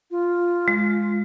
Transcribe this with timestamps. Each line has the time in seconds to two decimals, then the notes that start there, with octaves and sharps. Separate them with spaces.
0.11 F4
0.68 G#3